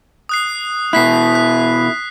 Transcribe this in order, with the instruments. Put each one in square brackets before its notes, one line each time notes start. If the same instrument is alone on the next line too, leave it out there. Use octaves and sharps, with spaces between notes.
[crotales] D#6 F#6 C7
[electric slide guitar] B2 E4 [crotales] F#6 B6 C7
[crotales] F#6